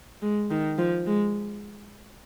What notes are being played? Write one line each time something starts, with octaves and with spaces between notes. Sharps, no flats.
G#3
D#3
F3
G#3